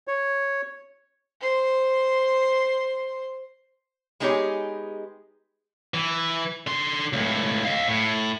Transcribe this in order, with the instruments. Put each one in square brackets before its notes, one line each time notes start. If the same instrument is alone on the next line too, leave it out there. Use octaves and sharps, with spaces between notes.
[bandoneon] C#5
[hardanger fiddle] C5 C6
[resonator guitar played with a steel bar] G#3 B3 D#4 G4 G#4 C#5
[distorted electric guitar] E3
D3 C6
C#2 A2
D#5 F5
A2